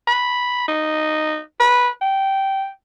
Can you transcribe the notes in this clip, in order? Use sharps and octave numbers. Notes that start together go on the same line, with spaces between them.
B5
D#4
B4
G5